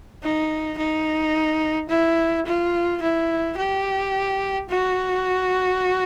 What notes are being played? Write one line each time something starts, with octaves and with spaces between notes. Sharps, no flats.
D#4
D#4
E4
F4
E4
G4
F#4